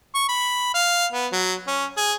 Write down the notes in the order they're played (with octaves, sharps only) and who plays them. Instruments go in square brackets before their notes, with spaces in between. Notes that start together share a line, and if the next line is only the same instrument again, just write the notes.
[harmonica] C#6
B5
F5
B3
F#3
C#4
G#4